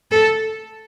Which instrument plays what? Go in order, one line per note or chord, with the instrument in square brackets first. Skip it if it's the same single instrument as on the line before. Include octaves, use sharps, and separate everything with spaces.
[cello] A4